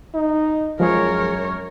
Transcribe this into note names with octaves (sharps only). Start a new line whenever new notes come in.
D#4
F#2 F3 G#3 G#4 A#4 C#5